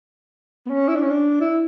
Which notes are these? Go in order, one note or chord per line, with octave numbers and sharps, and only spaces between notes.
B3
C#4
E4
D4
C#4
D4
E4